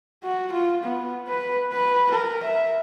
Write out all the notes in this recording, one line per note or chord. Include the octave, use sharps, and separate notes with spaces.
F#4
F4
B3
B4
B4
A#4
E5